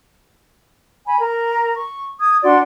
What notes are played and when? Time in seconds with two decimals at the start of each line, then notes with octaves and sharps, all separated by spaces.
1.07 G#5 B5
1.21 A#4 A#5
1.76 C#6
2.19 D#6 G#6
2.42 D4 F#4 D5 C6